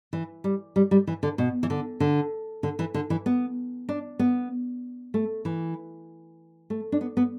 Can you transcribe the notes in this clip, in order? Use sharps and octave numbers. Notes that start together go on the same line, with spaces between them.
E3
G3
G3
G3
E3
D3
B2
E3
D3
D3
D3
E3
D3
E3
B3
D4
B3
A3
E3
A3
D4
B3
B3